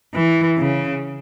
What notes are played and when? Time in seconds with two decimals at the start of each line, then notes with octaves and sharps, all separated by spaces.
0.14 E3
0.58 C#3